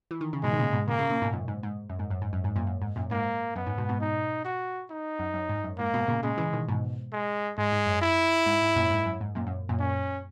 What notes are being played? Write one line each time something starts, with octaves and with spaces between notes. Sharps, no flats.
E3
D#3
C#3
G#2 B2 G#3
D#3
A#2 C#3
G#2 B2
A#2 C#3 A#3
A#2 C#3
A#2 C#3
G#2 B2
F#2 A#2
G#2
G#2
F#2
G#2
F#2
G#2
F#2
G#2
F#2 A#2
F#2
G#2
F#2 A#2
G#2 A#3
F#2 B3
G#2
G#2 B2
G#2 B2
D#4
F#4
D#4
F#2
F#2
G#2
F#2
G#2 A#3
G#2 B2
A#2 C#3
A#2 C#3 G#3
C#3 E3
B2 D#3
G#2 B2
G#3
G#2 G#3
G#2
F#2
E4
G#2
G#2
F#2 A#2
G#2
F#2
G#2
F#2 A#2
F#2
F#2 A#2
C#4